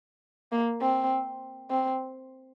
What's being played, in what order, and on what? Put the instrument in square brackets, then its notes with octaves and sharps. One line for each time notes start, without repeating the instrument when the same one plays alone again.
[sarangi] A#3
C4
C4